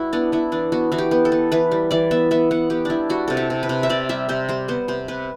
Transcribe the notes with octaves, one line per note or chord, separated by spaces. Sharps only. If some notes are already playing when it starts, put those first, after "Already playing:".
Already playing: G3 E4 F#4 B4
B3 D4
B3 E4
E3 D4
B3 F#4
E3 F#4
G4
B3
A4
B3
E3 B4
G3
E3 D5
B3 E5
B3 E5
B3 F#5
B3 G4
G3 D4 E4
G3 F#4
C3 A4
G4
C3
B4
C3
E5
C3 D5
G3 E5
C3 C5
G3 C5
B3 C5
C3 C5
C3 B4